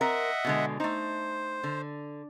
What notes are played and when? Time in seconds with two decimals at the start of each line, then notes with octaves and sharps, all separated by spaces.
0.01 C4 A#4 D#5 E5 F#5
0.45 B2 D3 G#3
0.80 A3 D#4 C5
1.63 D3